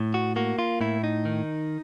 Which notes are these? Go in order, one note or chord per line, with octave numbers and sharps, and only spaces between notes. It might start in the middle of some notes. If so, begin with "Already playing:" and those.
Already playing: A2
F#4
A#3 F#4
F4
A2 E4
D#4
D#3